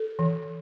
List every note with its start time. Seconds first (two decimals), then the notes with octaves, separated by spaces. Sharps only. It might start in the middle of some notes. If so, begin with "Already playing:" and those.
Already playing: A4
0.19 E3